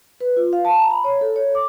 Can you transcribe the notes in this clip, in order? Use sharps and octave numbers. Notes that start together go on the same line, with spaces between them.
B4
F4
F5
A5
A#5
B5
C#5
A4
C#5
D6